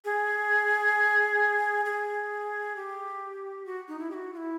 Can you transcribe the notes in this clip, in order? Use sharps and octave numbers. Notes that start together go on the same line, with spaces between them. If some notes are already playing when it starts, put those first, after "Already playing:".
G#4
G#4
G4
F#4
D#4
E4
G4
F#4
F4
E4